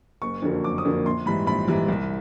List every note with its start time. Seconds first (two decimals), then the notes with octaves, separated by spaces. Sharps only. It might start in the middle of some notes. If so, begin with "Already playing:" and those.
0.22 F#1 C#6
0.42 F2 D3 F#3 A#3
0.64 F#1 D6
0.78 D#6
0.85 F2 D3 F#3 A#3
1.05 A#1 C6
1.26 G#2 E3 G3 B5
1.47 A#1 B5
1.67 G#2 E3 G3
1.88 C2